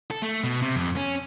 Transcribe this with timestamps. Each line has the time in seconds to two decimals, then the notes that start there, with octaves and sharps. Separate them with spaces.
0.11 A4
0.22 A3
0.44 B2
0.62 C3
0.76 F2
0.96 C#4